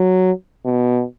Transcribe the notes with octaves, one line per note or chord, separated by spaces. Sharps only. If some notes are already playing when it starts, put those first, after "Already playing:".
Already playing: F#3
B2